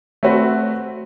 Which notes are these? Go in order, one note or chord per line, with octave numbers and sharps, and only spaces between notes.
A3 C4 F#4 B4